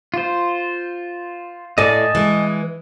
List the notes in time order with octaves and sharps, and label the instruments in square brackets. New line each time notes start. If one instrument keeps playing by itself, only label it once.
[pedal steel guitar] F4 C5
[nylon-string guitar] A2 D5 [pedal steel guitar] D#5 G#5 A5
[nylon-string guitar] E3 G#3